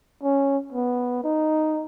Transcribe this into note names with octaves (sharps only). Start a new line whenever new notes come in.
C#4
B3
D#4